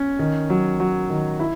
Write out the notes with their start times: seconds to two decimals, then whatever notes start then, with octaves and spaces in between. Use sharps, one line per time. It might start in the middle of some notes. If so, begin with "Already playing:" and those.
Already playing: C#4
0.19 D#3
0.50 F#3
0.80 F#3
1.10 D#3
1.40 E4